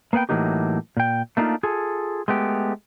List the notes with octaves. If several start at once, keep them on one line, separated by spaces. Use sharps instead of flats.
A#3 B3 B4 F#5 G5
A2 E3 F#3 A#3 D#4 G4
A#2 G5
A3 A#3 D4 D#4 F4
F4 G#4 A4
G#3 A3 B3 G4